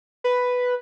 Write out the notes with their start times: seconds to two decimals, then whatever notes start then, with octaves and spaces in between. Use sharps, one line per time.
0.24 B4